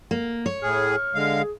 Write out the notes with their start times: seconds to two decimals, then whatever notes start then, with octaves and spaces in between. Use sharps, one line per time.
0.11 A#3
0.46 C#5
0.63 A2 G#4 F6
1.15 D3 G#3 F5
1.38 G#4